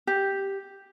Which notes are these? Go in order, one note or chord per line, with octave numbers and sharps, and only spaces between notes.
G4